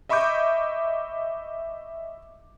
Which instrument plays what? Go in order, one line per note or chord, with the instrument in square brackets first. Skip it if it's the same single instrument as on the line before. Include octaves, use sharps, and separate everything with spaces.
[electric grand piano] D#5 E5 B5 C#6 D6 G6